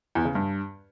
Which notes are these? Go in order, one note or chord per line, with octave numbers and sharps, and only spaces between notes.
E2
C#3
G2